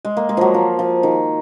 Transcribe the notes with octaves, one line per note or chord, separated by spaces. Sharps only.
G#3
A#3
G#3
F3 F#3
F3
F3
D#3